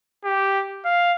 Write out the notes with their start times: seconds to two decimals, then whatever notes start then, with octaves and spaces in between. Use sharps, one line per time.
0.24 G4
0.85 F5